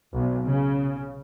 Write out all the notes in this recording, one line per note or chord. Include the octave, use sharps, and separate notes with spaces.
B1
C#3